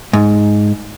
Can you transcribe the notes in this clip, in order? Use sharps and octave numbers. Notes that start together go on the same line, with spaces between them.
G#2